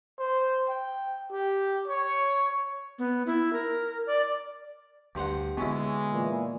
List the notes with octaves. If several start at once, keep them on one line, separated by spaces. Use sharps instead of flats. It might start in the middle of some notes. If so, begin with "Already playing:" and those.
C5
G5
G4
C#5
B3
E4
A#4
D5
D2 G2 C5 F#5
B2 D3 G#3 B3 C#4 E4
A#2 E3